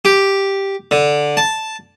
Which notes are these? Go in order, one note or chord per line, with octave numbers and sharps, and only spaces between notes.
G4
D3
A5